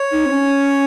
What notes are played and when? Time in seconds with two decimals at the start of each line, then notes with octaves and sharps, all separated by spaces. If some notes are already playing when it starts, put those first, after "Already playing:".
Already playing: C#5
0.12 D#4
0.26 C4
0.32 C#4